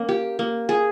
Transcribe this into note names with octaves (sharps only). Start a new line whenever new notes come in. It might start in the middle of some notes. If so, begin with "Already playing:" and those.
Already playing: A#3 C#4
G4
A#3
G#4